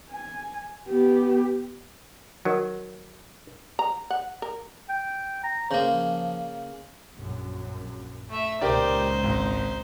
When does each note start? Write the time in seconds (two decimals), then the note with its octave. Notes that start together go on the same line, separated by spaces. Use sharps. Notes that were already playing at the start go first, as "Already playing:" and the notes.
0.11 G#5
0.88 B3 G4
2.45 D#3 F#3
3.79 A#5
4.10 F#5
4.42 A#4
4.89 G5
5.44 A#5
5.71 C#3 A#3 C5
5.93 F3
7.16 A#1 F#2
8.29 A3 E5
8.61 C#2 A#2 D#4 G4 A#4 C5 D5
9.23 G#1